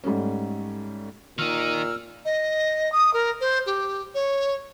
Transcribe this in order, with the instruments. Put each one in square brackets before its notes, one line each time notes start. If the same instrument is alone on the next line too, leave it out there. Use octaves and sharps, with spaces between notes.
[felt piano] G#2 G3 A3 C#4
[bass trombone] A#2 [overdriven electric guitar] D#3 D#4 [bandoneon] E6 F6
[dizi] D#5
D#6
A#4
C5
G4
C#5